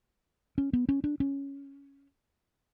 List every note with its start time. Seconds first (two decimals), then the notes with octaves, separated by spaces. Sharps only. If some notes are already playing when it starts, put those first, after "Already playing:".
0.58 C#4
0.73 B3
0.89 C#4
1.04 D4
1.20 C#4